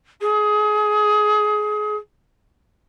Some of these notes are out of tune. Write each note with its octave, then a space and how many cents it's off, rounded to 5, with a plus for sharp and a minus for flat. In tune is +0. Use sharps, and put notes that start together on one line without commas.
G#4 +25